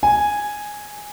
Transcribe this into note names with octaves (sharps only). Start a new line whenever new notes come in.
G#5